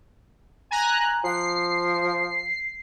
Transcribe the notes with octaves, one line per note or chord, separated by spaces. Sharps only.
G#5 A#5 F#6
F3 C7